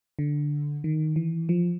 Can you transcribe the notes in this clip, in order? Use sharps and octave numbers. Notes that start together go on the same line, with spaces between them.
D3
D#3
E3
F3